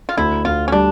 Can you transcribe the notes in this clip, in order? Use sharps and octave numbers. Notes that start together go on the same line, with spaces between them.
F4
D2 E4
D2 F4
C#4
G3 D4